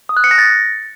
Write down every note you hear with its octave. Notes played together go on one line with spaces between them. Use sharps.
D#6
F#6
C#7
A#6
A6